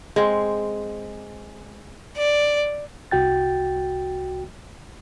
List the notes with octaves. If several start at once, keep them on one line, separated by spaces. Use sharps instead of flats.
G#3 C4
D5
C2 F#4 G5 A6